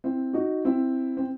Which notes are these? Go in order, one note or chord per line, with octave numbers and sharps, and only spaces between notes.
C4 E4
D#4 F#4
C4 E4
C4